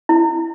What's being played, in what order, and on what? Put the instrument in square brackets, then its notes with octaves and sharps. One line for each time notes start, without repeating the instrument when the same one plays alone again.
[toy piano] E4